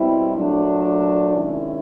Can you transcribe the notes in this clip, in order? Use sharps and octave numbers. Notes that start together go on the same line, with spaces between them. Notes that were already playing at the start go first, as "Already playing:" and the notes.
Already playing: B2 G3 C4 E4
A#2 F#3 A3 D4
C3 D#3 G#3 C#4 E4